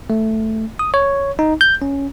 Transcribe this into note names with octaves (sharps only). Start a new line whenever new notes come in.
A3
D#6
C#5
D#4
G6
C#4